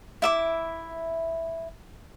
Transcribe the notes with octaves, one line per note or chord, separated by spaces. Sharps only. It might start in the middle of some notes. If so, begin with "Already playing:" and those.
E4 E5 D6